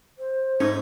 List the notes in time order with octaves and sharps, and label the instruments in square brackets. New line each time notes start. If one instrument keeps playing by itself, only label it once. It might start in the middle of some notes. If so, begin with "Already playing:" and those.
[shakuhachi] C5
[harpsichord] G#2 A3 [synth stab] C#4 D#4